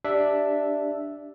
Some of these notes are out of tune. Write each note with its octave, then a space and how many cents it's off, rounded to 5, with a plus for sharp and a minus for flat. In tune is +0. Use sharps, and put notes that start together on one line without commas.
D4 +0 G4 +0 E5 +0